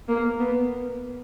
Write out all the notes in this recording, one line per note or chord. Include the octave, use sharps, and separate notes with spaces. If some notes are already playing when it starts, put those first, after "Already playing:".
A#3
B3